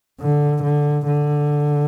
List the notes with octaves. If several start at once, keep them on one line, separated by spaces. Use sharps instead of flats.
D3
D3
D3